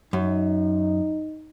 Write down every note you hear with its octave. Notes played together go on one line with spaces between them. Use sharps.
F#2 D#4